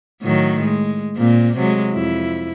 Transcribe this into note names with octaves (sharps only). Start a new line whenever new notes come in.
A2 D#3 F#3
G#3
A#2 A#3 C4
C3 F#3 G#3
F2 E4